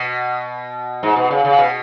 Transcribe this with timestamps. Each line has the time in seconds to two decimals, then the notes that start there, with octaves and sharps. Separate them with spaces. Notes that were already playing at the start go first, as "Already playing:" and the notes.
Already playing: B2
1.03 G#2
1.16 B2
1.30 C#3
1.45 C#3
1.58 B2